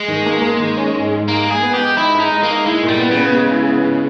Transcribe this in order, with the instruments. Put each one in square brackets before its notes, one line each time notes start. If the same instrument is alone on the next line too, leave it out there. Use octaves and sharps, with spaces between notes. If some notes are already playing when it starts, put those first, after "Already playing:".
Already playing: [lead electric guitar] G#3
[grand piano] D#3
A#3
A#3
D#3
C#4
G#2
G#2
[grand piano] G#3 [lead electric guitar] A#3
[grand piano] G#3
[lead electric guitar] G#4
[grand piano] B3
[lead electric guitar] G4
[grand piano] G#3
[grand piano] D#4 [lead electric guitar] E4
[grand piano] G#3
[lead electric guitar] D#4
[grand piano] G#3
[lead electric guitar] A#3
[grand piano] D#4
[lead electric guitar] G#3 [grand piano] E4
[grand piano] A#2
[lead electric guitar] G3
[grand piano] B3
[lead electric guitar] C#3
[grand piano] B3
G#3
E4
B3
G#3